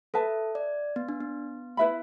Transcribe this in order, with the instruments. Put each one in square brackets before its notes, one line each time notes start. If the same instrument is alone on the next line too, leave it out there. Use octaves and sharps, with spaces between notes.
[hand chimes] A4 [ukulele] B4 E5 A5
[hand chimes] D5
B3
D4
B3
[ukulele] E4 B4 E5 B5